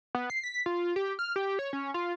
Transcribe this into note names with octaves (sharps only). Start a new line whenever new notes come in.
B3
C7
B6
F4
G4
F6
G4
C#5
C#4
F4